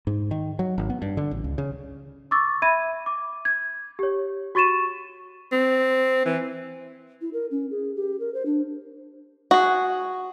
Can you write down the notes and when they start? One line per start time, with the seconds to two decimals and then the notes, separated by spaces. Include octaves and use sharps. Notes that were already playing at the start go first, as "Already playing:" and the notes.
0.07 G#2
0.31 D#3
0.59 F#3
0.78 G#1
0.90 B3
1.02 G2
1.17 D3
1.31 A1
1.44 C#2
1.58 C#3
2.31 C#6 D6 E6 A6
2.62 E5 B5 G#6 D#7
3.06 D6
3.45 G#6
3.99 G4 C#5
4.55 F#4 C#6 A6 D#7 E7
5.52 C4
6.26 E3
7.21 E4
7.33 A#4
7.51 C#4
7.71 G#4
7.96 G4
8.20 A#4
8.34 C5
8.46 D4
9.51 F#4 G#4